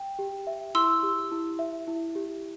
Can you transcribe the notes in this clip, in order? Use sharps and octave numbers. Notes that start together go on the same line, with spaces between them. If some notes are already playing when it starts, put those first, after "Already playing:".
Already playing: G5
G4
E5
E4 C6 E6
G4
E4
E5
E4
G4